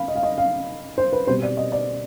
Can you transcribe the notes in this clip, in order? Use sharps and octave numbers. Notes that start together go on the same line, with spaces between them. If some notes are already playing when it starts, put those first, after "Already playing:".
Already playing: B3 F5 B5
D#5
F5
D#5
F5
C5
B4
B2 G3 C4 C5
D5
D#5
D5